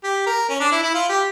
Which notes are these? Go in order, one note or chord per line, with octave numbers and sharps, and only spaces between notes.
G4
A#4
C#4
D4
E4
E4
F4
G4